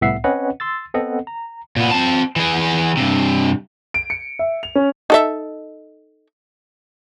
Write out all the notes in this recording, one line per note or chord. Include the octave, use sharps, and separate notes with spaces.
C2 A2 B3 E5 F#5 C7
C4 C#4 B4 C#5 D#5 F#5
C6 E6 A6
B3 C4 A4 D#5 F#5
A#5
A#2 B3
C4 A5
E3 G#4
G2 C3
D7
C#7
E5
F7
C#4
D#4 A4 E5